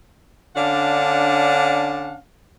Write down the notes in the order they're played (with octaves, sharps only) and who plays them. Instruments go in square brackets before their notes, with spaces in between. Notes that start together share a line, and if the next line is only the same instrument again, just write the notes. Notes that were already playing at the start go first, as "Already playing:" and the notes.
[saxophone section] D3 C#4 D4 F5 F#5